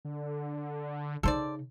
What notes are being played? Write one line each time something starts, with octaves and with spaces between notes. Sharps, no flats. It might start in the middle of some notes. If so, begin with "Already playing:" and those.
D3
C#3 D#4 A4 C5 D5